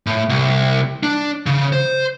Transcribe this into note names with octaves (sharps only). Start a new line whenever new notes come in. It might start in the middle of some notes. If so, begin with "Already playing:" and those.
A2
C2
D4
C#3
C5